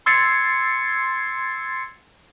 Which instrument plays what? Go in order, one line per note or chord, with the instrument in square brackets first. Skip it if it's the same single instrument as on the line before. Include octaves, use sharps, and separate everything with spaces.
[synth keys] C6 E6 G#6 A6 C7 C#7